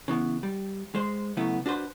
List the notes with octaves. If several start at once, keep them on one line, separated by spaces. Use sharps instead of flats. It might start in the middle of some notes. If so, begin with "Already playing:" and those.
C#3 E3 B3
G3
G#3 C5
C#3 F#3 A3 B3 E4
D4 F#4 B4 C5